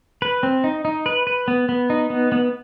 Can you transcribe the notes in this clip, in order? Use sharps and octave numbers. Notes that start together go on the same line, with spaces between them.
B4
C4
D#4
D#4
B4
B4
B3
B3
D#4
B3
B3